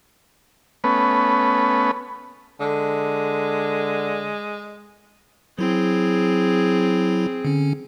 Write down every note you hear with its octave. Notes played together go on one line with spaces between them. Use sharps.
A3 B3 C#4 B4
D3 G#3
F#3 C4 E4 G#4
D3 C#4